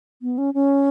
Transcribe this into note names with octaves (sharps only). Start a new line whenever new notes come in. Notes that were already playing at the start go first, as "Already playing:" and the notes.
B3
C#4
C#4